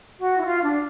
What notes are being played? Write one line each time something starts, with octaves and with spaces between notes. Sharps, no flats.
F#4
E4
F4
D4